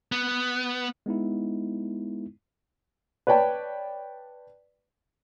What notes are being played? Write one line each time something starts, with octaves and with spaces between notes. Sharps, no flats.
B3
G#3 B3 D#4 E4
B4 C#5 D5 G5 A5